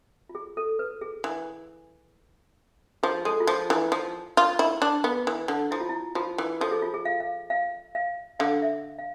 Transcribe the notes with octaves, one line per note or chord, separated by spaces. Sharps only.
F4
G#4
A4
B4
G#4
E3
F3 G#4
G#3 A4
F4
F3 G#4
E3 E4
F3
F4
E4
D4
B3
E3
D3
F3 E4
F4
E4
F3 F4
E3
F3 A4
G#4
F4
G#4
F5
F5
F5
F5
D3 F5
E5
F5